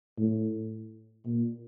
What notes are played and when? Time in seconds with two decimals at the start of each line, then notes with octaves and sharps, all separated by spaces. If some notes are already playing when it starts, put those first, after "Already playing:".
0.18 A2
1.26 A#2